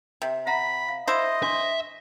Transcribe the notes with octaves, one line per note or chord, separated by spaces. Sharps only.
C3
E5 F#5 A#5 B5
F5
E4 C5 D#5
D4 E5 C6 C#6